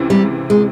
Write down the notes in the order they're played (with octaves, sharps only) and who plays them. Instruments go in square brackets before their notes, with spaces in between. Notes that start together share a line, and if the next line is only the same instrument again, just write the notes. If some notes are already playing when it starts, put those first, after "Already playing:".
Already playing: [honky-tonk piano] C#2 C3 E3
[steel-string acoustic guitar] G3
G#3